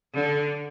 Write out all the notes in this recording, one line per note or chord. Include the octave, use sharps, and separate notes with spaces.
D3